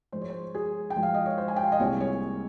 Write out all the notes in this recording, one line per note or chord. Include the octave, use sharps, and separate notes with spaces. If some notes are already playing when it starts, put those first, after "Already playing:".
G#2 F3 G#3 C5
C#5
C5
G#4
G5
G#2 F3 G#3
F5
D#5
C#5
C5
G#5
G5
F5
D#5
C2 A#2 G#3 C4 C#5
C#5